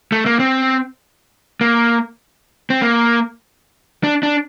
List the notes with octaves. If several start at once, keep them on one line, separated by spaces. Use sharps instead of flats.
A3
A#3
C4
A#3
C4
A#3
D4
D4